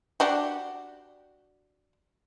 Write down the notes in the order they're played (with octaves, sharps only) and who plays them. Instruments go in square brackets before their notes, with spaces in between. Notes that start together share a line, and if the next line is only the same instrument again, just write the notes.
[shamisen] D4 F#4 G4